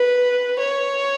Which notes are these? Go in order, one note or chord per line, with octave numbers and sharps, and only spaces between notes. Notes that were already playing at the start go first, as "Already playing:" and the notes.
Already playing: B4
C#5